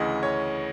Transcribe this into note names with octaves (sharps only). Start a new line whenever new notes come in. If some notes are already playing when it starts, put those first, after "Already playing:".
Already playing: D2 C#3 E3 D#5
C#5